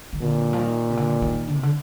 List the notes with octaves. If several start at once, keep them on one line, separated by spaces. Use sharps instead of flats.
D#3
A#2 D3
F3
D#3
C3
D3
D#3
D3
C3
D3